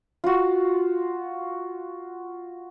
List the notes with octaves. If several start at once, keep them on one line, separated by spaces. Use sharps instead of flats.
F4 F#4